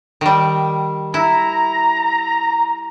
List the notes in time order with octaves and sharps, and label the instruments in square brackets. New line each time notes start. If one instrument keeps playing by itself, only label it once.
[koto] D#3 G3
[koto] E4 [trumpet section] A#5